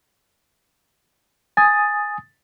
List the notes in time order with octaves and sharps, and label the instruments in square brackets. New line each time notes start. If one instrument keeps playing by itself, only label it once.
[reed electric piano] G#5 D#6 [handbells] A6